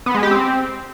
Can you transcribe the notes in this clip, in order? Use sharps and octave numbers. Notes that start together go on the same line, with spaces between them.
B3
G#3
G4
C4